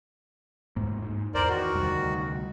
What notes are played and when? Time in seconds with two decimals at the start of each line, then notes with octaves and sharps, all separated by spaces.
0.76 G#2 A#3
1.02 G#2
1.35 E2 A#4 C5 D5
1.49 D#3 F#4
1.75 D2 C3 G3